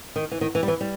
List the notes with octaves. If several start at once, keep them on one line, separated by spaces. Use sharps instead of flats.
D#3
E3
D#3
E3
G3
E3
G3